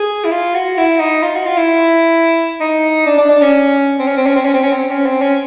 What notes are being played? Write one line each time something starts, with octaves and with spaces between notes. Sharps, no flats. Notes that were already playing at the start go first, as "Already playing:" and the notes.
Already playing: G#4
E4
F4
F#4
E4
D#4
F4
F#4
F4
E4
D#4
D4
D4
D4
C#4
C4
C#4
C4
C#4
C4
C#4
C4
C#4
C4
C#4
C4
C#4